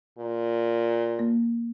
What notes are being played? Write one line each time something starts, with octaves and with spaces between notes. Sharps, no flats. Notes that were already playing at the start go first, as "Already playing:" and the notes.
A#2
A#3